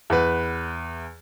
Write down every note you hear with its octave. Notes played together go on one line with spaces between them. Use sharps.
E2 B4